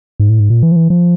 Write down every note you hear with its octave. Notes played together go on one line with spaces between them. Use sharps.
G#2
A2
G#2
A#2
E3
F3
E3
F3